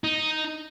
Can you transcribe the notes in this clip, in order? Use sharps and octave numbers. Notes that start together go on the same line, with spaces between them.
D#4